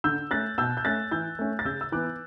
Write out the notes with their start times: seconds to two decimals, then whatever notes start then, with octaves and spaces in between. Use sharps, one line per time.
0.04 D3 E6 G6
0.31 A3 C#4 F#6 A6
0.58 B2 E6 G6
0.77 G6
0.85 A3 C#4 F#6 A6
1.12 E3 E6 G6
1.39 A3 C#4
1.59 A6
1.65 C#3 E6 G6
1.81 E6
1.92 E3 B3 D6 F#6